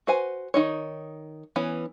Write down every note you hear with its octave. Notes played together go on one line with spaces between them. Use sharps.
F#4 B4 C5 F#5 G#5
D#3 D#4 C#5
E3 B3 C#4